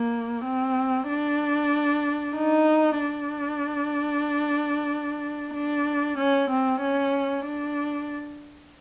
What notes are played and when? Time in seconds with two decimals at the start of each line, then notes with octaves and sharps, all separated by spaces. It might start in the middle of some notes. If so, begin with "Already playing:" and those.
Already playing: A#3
0.46 C4
1.09 D4
2.36 D#4
3.00 D4
5.54 D4
6.18 C#4
6.50 C4
6.81 C#4
7.45 D4